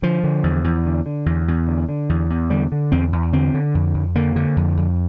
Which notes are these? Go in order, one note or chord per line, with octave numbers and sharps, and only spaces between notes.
D3 F3
D3
E2
E2
D3
D3
E2
E2
D3
D3
E2
E2
D3 G3
D3
E2 C4
E2
D3 C4
D3
F2
F2
D3 A#3
D3
F2
F2